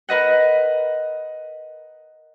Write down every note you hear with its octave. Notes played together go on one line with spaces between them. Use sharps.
A#4 B4 D#5 F#5